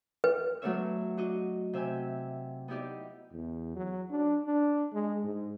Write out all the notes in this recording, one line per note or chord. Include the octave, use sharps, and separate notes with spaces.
B4
F#3 A3 B3 D4 C#5 E5
D4 F#4 D#5
C3 E5 G5 G#5
B3 D#4 E4 G4 D5 D#5
E2
F#3
D4
D4
G#3
G#2